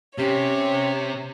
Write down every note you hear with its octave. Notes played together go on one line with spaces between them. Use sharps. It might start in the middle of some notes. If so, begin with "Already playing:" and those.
C3 C#4 G4 C#5